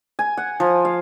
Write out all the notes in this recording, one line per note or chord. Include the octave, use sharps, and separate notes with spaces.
G#5
F#5
F3
F5